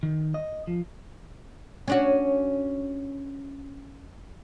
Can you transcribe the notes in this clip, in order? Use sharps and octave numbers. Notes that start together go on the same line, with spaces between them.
D#3
D#5
F3
C#4 D4 F#4